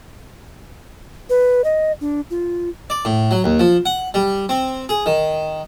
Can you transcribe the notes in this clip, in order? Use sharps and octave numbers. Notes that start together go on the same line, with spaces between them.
B4
D#5
D4
F4
D5
A2
F#3
D#2
F3
F#5
G3
C4
G#4
D#3